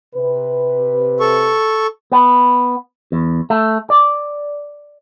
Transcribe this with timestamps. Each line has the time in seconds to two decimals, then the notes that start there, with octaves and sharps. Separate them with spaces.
0.15 C3 B4
1.20 A4 C#6
2.12 B3
3.12 E2
3.50 A3
3.90 D5